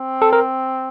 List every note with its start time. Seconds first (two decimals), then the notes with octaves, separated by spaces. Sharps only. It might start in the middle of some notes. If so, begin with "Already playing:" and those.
Already playing: C4
0.22 A4
0.33 A#4